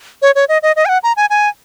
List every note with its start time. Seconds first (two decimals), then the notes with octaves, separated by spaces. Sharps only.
0.22 C#5
0.35 C#5
0.49 D#5
0.63 D#5
0.76 D#5
0.85 G#5
0.89 F#5
1.03 A#5
1.17 G#5
1.30 G#5